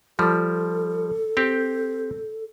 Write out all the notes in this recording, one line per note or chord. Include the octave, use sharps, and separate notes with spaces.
F3 G3 A4
C4 G4